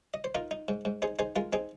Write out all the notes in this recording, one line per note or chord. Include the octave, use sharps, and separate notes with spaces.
D#5
C5
D#4 F4 A#4
D#4
G#2
G#2
D#4 G#4 C5
D#4 G#4 C5
G#3 F4 A#4
C4 D#4 G#4